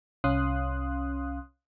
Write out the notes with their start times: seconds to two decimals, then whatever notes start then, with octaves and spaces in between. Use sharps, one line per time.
0.24 C2 C#4 F5 C6 D#6 F#6